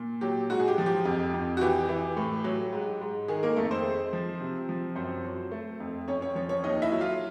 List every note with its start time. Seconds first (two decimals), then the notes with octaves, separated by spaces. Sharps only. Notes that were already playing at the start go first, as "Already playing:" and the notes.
Already playing: A#2
0.21 F#3 G4
0.50 G#2 F#4
0.60 G#4
0.68 G4
0.78 F3
0.86 G4
1.05 F2
1.34 F2
1.57 F#4
1.61 E3 G4
1.89 E3
2.17 A2
2.44 F#3
2.73 G#2
3.01 G#2
3.28 D#3 G#3 G#4
3.43 A#3 A#4
3.57 F2 A3 A4
3.71 C4 C5
3.84 G#3
4.13 F3
4.41 C3
4.69 F3
4.95 F#2 C4 C5
5.25 F#3
5.51 A3
5.80 F2
6.08 F2 C#4 C#5
6.21 C#4 C#5
6.35 F3 C#4 C#5
6.49 C#4 C#5
6.63 D#2 D#4 D#5
6.82 E4 E5
6.92 F#3
7.01 F4 F5